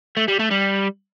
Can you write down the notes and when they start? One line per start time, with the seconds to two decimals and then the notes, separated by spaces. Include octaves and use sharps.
0.17 A3
0.28 G3
0.40 A3
0.51 G3